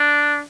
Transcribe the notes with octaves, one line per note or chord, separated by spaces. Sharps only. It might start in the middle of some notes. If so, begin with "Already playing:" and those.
Already playing: D4